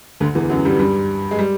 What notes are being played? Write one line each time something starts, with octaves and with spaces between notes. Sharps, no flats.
D2 D3
E2 E3
F#2 F#3
G2 G3
G2 G3
G#3
G3